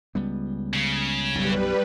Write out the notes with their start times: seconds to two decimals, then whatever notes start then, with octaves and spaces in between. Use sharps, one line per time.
0.15 C#2 G3 B3
0.74 C#3
1.35 B1 F#2 G3 B4